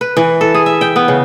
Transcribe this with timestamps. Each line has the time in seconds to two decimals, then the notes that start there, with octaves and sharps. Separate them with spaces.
0.01 B4
0.17 E3
0.41 A4
0.54 G#4
0.66 E5
0.81 G5
0.96 B3
1.08 C#3